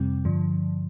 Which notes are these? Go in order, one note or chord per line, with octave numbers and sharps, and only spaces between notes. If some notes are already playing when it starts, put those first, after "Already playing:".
Already playing: F2 C3 G3 C4
G2 D3 F3